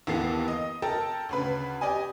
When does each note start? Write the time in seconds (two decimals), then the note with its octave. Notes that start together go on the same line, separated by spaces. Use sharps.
0.07 D#2 E3 A#3 B3 A4 C7
0.48 D#5
0.82 A4 A#4 G5 A5
1.29 D2 C#3 B4
1.81 G4 D5 D#5 G#5